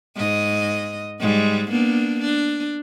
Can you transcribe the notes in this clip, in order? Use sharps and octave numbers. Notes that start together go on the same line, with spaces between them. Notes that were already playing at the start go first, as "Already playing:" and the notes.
G#2 D#5
G#2 G3 G#3
A#3 B3 D4
D4